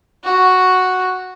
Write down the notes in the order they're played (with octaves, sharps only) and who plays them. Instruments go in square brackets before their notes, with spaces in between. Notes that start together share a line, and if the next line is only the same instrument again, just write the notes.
[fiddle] F#4